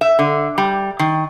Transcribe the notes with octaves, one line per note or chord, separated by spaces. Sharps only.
E5
D3
G3
D#3